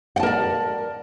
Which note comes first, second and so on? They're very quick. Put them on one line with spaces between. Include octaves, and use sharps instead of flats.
F#5 A5 A#4 D5